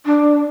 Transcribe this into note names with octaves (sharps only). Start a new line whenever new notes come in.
D4